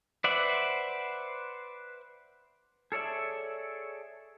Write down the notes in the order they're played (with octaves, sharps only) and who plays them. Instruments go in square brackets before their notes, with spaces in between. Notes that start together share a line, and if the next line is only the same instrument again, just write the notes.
[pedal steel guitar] B4 C5 D5 E5 F#5
G#4 A4 C#5 D5 E5